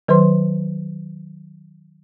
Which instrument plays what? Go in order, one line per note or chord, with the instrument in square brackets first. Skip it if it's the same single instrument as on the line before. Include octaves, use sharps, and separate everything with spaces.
[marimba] D#3 F#3 B4 C5 C6